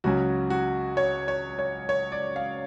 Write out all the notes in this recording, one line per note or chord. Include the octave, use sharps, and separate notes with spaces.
C#2 C#3 F#3 C#4 F#4
F#4
C#5
C#5
C#5
C#5
D5
F5